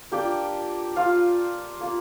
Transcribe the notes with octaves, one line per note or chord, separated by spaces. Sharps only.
A#3 D4 F4 G4 G5
F4 F5
A#3 F4